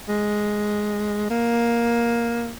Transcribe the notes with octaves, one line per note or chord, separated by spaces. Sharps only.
G#3
A#3